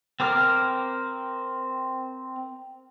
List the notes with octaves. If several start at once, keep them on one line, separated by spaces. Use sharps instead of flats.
C4 A#4 D6 F6